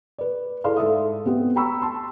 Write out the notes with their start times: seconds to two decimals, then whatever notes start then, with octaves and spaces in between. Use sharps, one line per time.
0.18 B4 D5
0.64 E4 G#4 A4 D5 F5 C6
0.77 G#2 A4 E5 D#6
1.26 B3 C4 G4
1.56 G5 A#5 B5 C#6 E6
1.82 A5 C6